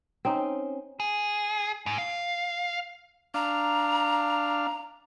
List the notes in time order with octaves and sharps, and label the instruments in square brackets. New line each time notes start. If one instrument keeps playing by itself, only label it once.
[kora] C4 C#4 D#4
[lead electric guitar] G#4
G#2
F5
[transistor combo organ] D4 F5 [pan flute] A#5